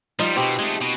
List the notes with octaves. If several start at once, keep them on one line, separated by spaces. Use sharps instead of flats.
F3 G3 D#4 F4
B2 C4 G4
G#3 A3
B2